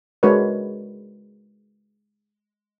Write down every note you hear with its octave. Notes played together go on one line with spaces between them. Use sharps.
G#3 D4 F#4 A#4 B4 C#5